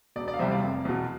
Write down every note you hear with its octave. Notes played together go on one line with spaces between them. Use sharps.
E1 D5
D5
F5
E2 C3 G3 C5 E5
D5 F5
F1
E2 B2